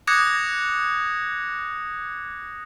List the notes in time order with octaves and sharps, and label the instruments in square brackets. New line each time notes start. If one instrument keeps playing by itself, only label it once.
[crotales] D6 D#6 F#6 G#6 A#6 C#7